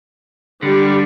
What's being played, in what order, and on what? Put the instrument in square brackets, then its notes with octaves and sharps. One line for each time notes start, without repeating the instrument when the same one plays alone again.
[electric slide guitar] D3 [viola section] G3